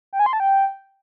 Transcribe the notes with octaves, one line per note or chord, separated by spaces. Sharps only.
G5
G#5
C6
A5
G5